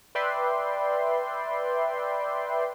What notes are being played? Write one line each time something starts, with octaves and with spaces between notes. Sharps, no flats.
B4 D5 E5 G5 C6